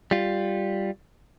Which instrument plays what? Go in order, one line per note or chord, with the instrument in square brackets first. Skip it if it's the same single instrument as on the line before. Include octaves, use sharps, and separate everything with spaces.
[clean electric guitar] G3 F4